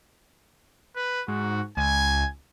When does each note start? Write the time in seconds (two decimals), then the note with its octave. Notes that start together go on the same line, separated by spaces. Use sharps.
0.96 B4
1.28 G#2 F#4
1.77 C#2 G#5